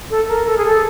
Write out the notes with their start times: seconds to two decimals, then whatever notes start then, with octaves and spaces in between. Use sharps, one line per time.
0.11 A4
0.28 A#4
0.46 A4
0.58 G#4
0.65 A4